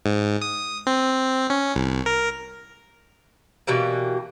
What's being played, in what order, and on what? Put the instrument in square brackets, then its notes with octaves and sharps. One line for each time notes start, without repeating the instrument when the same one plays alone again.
[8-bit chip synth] G#2
D#6
C4
C#4
C2
A#4
[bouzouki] B2 E3 G3 A#3